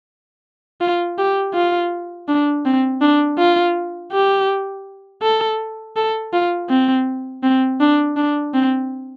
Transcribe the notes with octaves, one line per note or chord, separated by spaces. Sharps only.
F4
G4
F4
D4
C4
D4
F4
G4
A4
A4
F4
C4
C4
D4
D4
C4